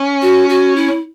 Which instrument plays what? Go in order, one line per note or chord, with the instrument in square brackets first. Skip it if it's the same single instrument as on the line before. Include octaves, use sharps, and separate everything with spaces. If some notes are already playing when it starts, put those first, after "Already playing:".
Already playing: [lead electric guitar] C#4
[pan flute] F#4
F#4
E4